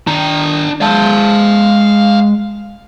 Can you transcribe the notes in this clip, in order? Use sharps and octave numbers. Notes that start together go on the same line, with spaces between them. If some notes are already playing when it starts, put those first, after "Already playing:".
D#3 D4 A#5
G#3 E5 F5 A5